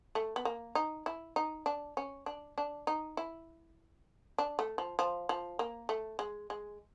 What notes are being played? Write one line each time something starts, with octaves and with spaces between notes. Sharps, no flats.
A3
B3
A#3
D#4
E4
D#4
D4
C#4
D4
D4
D#4
E4
D4
A3
F3
F3
F3
A#3
A3
G#3
G#3